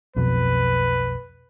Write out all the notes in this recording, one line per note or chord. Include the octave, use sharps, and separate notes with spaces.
B1 F2 B2 B4